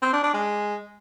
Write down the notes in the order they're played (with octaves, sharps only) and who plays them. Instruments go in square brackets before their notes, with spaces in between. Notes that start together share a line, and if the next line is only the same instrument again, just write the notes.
[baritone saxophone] C4
D4
D4
G#3